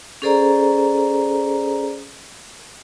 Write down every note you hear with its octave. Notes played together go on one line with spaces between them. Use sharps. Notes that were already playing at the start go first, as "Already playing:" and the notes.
C#4 G#4 A4 C5 D5 A#5